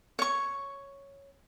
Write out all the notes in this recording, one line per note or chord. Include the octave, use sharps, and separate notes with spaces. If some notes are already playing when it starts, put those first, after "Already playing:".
C#5 C#6